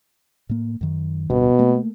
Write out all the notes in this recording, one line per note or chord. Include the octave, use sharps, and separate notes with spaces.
A2 A#3
F#2 D#3
D1 G2 B2 B3
A3 A#3